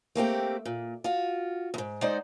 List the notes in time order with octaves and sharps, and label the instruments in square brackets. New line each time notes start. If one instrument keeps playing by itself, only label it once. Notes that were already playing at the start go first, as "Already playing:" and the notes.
[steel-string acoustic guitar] A3 A#3 C4 G4
A#2
F4 F#4
E2 G#2
G#3 D#4 C5 D5 F#5